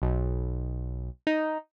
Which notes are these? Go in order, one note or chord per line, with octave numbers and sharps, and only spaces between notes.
B1
D#4